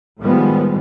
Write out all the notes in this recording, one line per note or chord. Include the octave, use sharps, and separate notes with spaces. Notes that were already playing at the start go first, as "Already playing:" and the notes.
A2 D#3 F3 G3 G#3 B3